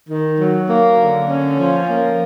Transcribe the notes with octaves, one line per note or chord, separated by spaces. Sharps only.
D#3
F#3
A#3
D3
C#4
F3
A#3